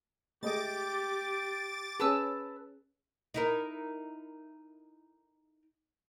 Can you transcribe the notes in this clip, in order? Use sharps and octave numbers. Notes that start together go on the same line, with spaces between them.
G#3 A3 G4 D#5 D6 A6
C#4 G#4 B4 A5 E6
D#4 E4 A#4